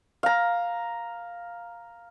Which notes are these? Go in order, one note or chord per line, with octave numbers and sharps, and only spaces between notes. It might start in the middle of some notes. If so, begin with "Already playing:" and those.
F5 A#5